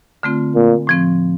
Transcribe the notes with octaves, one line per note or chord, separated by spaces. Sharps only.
D3 A3 C4 F4
A#2
A2 F3 C4